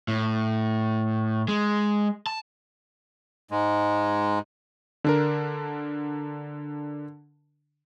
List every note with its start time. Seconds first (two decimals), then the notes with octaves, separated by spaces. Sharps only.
0.08 A2
1.48 G#3
2.27 A5
3.51 G#2 G#3
5.04 D3 D4 A#4